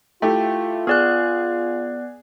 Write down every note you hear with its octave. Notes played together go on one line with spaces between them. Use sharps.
A3 E4 F4 G4 G5
B3 G#4 D5 F#6